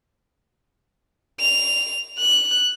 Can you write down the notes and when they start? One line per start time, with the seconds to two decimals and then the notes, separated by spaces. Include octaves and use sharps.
1.40 F7
2.19 F#6